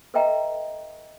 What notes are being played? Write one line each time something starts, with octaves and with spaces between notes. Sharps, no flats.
A4 B4 D#5 E5 G5 A#5